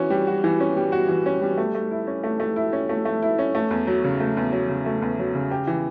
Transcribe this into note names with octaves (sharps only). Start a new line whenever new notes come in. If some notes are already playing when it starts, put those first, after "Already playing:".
Already playing: E3 C#4 F#4
G3
F#4
E3
C#4
G3
F#4
E3
C#4
G3
A3
A3
E4
C#4
A3
A3
E4
C#4
A3
A3
E4
C#4
A3
E2
F#3
C#3
A3
E2
F#3
C#3
A3
E2
F#3
C#3
G4
E3